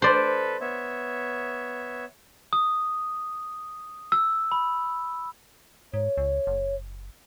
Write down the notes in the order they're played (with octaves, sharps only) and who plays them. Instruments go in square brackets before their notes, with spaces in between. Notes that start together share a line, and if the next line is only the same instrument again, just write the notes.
[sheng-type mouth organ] A4 B4 [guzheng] C5 D5
[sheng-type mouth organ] B3 C#5 E5
[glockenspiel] D#6
E6
B5
[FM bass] G#2 [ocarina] C#5
[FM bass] C#2
F#1